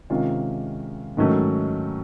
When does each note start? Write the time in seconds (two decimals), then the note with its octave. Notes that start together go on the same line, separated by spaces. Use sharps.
0.10 C3 D#3 G#3 C#4 F4
1.17 G#2 D#3 F#3 A3 C#4